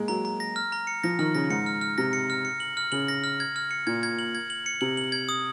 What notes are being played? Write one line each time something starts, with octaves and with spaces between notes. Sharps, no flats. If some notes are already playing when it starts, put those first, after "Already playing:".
Already playing: G#3 A#3
F#3 A#5
A#5
A#6
F6
A#5
C#7
F3 A#6
D#3 F6
C#3 A#6
G#2 C#7
F6
F6
C3 A#6
C#7
F6
C#7
F#7
F6
C#3 F#7
A#6
F6
G#6
F6
C#7
A#2 G#6
G#6
F#7
G#6
F#7
C#7
C3 F#7
F#7
G#6
D#6